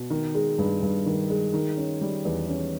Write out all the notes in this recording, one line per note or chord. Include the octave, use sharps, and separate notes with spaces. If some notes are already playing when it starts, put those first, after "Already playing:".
Already playing: B2
D#3
G#3
G2
G2
D#3
G#3
D#3
C#4
G3
E2
C#4